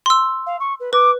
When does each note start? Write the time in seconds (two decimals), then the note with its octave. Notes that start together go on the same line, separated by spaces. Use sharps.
0.06 C6 E6
0.46 F5
0.60 C#6
0.80 B4
0.93 B4 D6